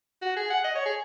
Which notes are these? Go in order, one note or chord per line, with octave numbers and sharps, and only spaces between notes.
F#4
G#4
F#5
D#5
C#5
G#4